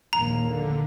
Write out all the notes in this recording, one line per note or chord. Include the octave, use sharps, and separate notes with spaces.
A#1 D#2 A#3 A#5
D3